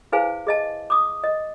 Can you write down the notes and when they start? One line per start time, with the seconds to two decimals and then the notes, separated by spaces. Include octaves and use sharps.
0.12 E4 G#4 B4 C5 F5 G#5
0.47 G#4 D#5 A5
0.90 D6 D#6
1.24 D#5